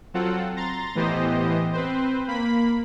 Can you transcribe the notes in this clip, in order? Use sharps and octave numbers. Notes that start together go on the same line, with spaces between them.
F#3 C4 F4 A4 F#5
A#5 C6 A6
A2 E3 B3 G4 C5 D#5
C4 B4 C5
A#3 B5 B6